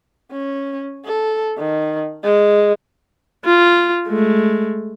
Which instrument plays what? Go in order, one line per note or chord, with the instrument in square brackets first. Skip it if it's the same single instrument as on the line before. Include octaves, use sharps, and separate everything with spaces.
[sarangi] C#4
A4
D#3
G#3
[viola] F4
G#3 A3